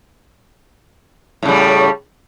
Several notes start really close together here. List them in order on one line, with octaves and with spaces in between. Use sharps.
A2 C#3 G3